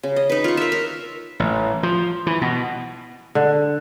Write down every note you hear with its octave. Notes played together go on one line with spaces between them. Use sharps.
C#3
D#5
D#4 B4
F4 C#6
A#4 E5
A#4
A1
F3
E3
B2
D3